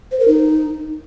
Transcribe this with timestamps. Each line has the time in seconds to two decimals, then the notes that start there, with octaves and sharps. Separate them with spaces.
0.12 C5
0.20 A#4
0.28 D#4